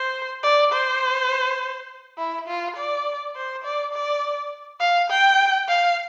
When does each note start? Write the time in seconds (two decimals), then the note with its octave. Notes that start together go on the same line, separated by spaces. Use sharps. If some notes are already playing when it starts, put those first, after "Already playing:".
Already playing: C5
0.43 D5
0.72 C5
2.18 E4
2.48 F4
2.76 D5
3.36 C5
3.64 D5
3.93 D5
4.81 F5
5.10 G5
5.68 F5